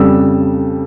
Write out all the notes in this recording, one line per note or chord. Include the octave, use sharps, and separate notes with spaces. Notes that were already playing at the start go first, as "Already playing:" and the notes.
Already playing: F2 C#3 G3 E6